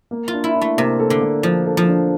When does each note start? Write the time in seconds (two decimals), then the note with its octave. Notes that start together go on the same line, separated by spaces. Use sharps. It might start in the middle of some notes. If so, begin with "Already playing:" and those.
0.11 A#3
0.28 F4
0.34 D4
0.44 E4
0.56 D4
0.61 A3
0.78 C3 A#3
1.00 A4
1.10 D3
1.21 A#3
1.43 F3 D4
1.66 A4
1.77 F3
1.88 D4